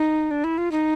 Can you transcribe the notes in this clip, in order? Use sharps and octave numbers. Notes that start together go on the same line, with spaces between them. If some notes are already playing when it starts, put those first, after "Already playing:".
Already playing: D#4
D4
E4
F4
D#4